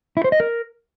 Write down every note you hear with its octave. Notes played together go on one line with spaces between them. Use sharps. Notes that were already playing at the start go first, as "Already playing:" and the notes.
E4
C5
D#5
A#4